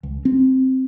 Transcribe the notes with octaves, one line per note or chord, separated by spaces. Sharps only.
C#2
C4